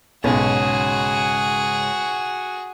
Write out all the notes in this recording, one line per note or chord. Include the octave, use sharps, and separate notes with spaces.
B1 G#2 C#3 F#4 G#4